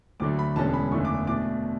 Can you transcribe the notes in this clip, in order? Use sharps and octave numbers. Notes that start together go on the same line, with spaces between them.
D2 D3 F#3 A3 D6
B5
E1 E2 D3 G#3 C#4 A5
B5
F#1 E2 D3 A3 C#6
D6
B2 A3 D4 D6